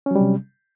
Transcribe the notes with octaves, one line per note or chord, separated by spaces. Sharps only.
C3 F#3 G3 C#4